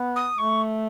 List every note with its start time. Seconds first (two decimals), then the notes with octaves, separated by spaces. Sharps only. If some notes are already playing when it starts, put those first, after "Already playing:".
Already playing: B3
0.15 D#6
0.38 A3 C#6